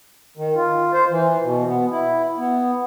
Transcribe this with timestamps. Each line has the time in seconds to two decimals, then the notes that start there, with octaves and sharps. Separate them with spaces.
0.38 D#3
0.56 F4
0.93 C5
1.10 E3
1.43 B2
1.67 B3
1.91 E4
2.37 B3